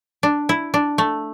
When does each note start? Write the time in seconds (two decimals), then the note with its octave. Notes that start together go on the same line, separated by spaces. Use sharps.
0.23 D4
0.49 E4
0.74 D4
0.98 A3